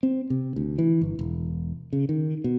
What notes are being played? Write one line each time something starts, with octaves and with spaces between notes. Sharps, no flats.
C4
C3
D2
E3
G1
E1
C#3
D#3
B2